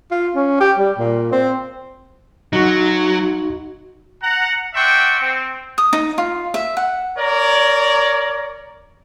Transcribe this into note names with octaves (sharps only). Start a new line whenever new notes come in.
F4
C#4
G4
G3
A#2
C4
F#3 D#4 F#4
F#5 A#5
D5 E5 F#5 G5 C6 C#6
C4
D#6
D#4
F4
E5
F#5
A#4 C#5 D5